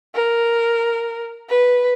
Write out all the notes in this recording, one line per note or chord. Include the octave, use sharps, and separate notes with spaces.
A#4
B4